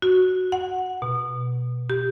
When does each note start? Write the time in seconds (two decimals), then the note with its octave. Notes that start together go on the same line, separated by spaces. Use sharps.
0.02 F#4
0.52 F#5
1.02 B2
1.90 G4